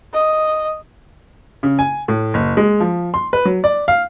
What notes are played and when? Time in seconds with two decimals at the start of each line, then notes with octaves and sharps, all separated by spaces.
0.13 D#5
1.63 C#3
1.79 G#5
2.08 A2
2.34 F#1
2.57 G#3
2.80 F3
3.14 C6
3.33 B4
3.45 F#3
3.64 D5
3.88 F5